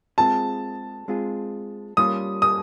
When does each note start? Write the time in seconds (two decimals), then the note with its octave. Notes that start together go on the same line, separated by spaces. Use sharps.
0.18 G#3 C4 F4 G#4 A5
1.08 G#3 C4 F4 G#4
1.97 G3 A#3 C#4 F4 D#6
2.42 D#6